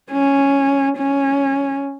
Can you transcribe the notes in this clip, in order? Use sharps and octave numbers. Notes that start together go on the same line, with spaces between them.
C#4
C#4